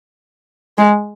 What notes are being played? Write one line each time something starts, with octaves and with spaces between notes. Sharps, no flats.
G#3